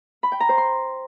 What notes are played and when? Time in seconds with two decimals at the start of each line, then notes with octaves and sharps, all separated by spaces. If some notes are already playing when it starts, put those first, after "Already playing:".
0.23 B5
0.32 G5
0.40 A#5
0.49 C5
0.58 C6